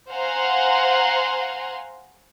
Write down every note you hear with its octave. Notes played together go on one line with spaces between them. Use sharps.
C5 F5 F#5 G#5 A#5 C6